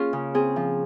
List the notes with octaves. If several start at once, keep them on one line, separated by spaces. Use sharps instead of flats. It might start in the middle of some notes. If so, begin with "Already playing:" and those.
Already playing: A#3 C#4 F4 G#4
C#3
C4 G#4
F3